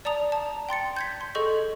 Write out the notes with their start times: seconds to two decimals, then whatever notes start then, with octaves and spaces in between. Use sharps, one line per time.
0.05 D5 A5 A#5 D#6 F7
0.32 A5
0.69 G5 C6 A6 C#7
0.96 G6 G#6 B6
1.21 C6
1.35 G#4 A4 D#5 C#6 G6